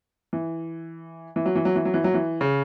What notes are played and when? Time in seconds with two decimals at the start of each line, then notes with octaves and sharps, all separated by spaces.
0.33 E3
1.36 E3
1.46 F#3
1.56 E3
1.65 F#3
1.76 E3
1.85 F#3
1.94 E3
2.04 F#3
2.14 E3
2.41 C#3